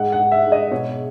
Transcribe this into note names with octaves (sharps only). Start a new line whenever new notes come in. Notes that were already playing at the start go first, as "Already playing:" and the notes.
Already playing: G#2 F#5
F#5
G#2
E5
G#2
D#5
B2 C#5